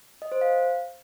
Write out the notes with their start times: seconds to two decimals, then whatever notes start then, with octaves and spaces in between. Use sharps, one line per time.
0.22 D#5
0.32 C5
0.41 F5